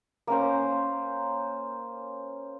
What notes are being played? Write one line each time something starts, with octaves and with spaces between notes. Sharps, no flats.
A#3 C#4 C5